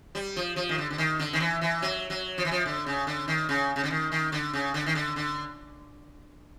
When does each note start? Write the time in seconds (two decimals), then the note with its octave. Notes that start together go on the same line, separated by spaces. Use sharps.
0.15 G3
0.36 F3
0.56 F3
0.69 D#3
0.78 D3
0.90 D3
0.98 D#3
1.19 D3
1.33 D#3
1.40 E3
1.61 E3
1.82 F#3
2.10 F#3
2.38 F3
2.45 E3
2.51 F3
2.66 D3
2.86 C#3
3.07 D3
3.28 D#3
3.49 C#3
3.76 C#3
3.84 D3
3.91 D#3
4.12 D#3
4.32 D3
4.53 C#3
4.74 D3
4.86 D#3
4.95 D3
5.16 D3